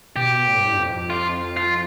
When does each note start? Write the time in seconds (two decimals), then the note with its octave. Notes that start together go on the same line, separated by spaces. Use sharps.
0.16 B2 G4
0.47 A2
0.58 G2
0.68 A2
0.73 G2
0.78 F2
1.10 F4
1.57 F4